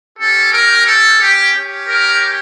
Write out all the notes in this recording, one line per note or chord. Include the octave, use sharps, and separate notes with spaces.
C#4 G4 A4
A#4
A4
G4
C#4 G4
A#4